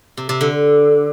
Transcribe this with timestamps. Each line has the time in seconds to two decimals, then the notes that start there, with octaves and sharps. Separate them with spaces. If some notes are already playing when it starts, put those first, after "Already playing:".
0.17 C3
0.29 C3
0.41 D3